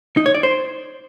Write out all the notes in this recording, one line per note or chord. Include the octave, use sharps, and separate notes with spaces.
D#4
C#5
D5
C5